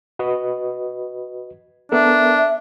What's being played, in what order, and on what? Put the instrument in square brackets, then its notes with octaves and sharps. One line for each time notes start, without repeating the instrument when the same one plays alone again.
[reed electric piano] F#4 B4 D#5
[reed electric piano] B3 A4 A#4 [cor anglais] D4 [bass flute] E5